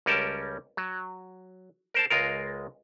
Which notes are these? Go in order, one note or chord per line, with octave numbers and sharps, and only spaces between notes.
C#2 G3 C#4 A#4 G5 A5
F#3
A#4 C5 A5
C#2 G#3 F4 A#4